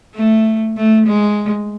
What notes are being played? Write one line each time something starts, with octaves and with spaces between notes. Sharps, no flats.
A3
A3
G#3